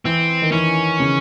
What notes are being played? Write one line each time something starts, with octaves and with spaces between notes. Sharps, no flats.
E3 C4
D#3
E3 C#4
C#3